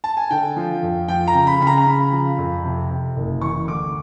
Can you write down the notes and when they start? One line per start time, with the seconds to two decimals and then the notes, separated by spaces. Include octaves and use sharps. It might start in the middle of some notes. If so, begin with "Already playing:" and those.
0.04 A5
0.17 G#5
0.31 D3 G5
0.57 F3
0.83 F2
1.08 F3 G5
1.27 A#5
1.35 C#3
1.47 B5
1.61 C#3 B5
1.67 A#5
1.78 A#5
1.86 C#3 B5
2.12 F3
2.38 F2
2.63 C3
2.90 C3
3.16 F#1
3.41 E3 C#6
3.67 D2 D6